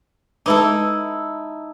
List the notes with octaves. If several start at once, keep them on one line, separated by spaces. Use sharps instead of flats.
G#3 D#4 E4 A4 B4 D6